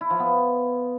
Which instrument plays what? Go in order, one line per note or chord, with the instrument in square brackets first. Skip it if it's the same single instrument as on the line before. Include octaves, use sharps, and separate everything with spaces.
[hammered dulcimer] E4
F3
B3